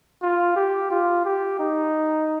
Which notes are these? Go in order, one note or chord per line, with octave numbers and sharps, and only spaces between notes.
F4
G4
F4
G4
D#4